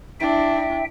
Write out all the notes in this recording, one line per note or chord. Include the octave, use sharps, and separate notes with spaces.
D4 E4 E5 G5